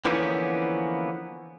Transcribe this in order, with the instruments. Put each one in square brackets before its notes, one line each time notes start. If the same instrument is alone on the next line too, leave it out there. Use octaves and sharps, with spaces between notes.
[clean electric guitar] D3 E3 F3 A#3 B3 C#4